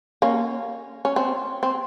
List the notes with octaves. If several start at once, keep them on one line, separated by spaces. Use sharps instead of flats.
A#3 C#4
C#4
C4
C4